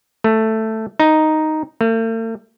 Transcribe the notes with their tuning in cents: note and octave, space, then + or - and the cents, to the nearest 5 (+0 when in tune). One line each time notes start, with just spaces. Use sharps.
A3 +5
D#4 +0
A3 +45